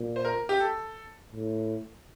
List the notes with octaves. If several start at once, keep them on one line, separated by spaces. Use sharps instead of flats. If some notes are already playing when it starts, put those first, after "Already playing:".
Already playing: A#2
C5
A#4
G4
A4
A2